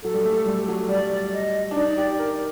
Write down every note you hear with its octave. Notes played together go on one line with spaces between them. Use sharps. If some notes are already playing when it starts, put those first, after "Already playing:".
F#3 A4
G3
A3
G3
F#3
G3 D5
D#5
D4
D#4 D5
G4
A#4